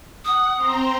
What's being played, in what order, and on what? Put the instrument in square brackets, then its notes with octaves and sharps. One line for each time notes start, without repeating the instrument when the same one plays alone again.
[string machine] F#5 [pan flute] D#6
[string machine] C4 C5 A#5